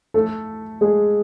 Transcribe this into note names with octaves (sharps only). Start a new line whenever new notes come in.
A3 A4
G#3 G#4